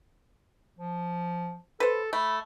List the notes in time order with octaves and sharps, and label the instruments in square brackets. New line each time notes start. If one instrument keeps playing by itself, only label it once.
[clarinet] F3
[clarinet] A4 [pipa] B4 C5
[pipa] A3 [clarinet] B5